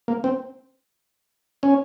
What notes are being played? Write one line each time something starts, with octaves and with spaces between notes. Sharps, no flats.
A#3
C4
C#4